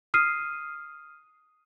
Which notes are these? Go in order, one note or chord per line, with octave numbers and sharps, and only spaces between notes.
D#6 F6 C7 D#7